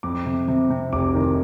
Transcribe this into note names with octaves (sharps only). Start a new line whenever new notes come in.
F2 D6
C3
C3
C3
F1 D6
D#3